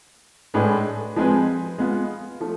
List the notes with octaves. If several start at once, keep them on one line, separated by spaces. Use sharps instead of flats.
A2 G#3 D4 G#4 B4
F3 G#3 C4 G#4 B4
G#3 B3 F4
F3 A3